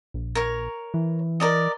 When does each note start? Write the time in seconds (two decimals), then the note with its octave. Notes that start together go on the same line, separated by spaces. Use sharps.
0.14 A#1
0.35 A#4 C#5
0.94 E3
1.40 A#4 D5 D#5